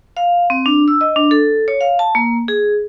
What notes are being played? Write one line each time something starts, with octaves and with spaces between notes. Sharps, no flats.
F5
C4
D4
E6
D#5
D4
A4
C#5
F5
A5
A#3
G#4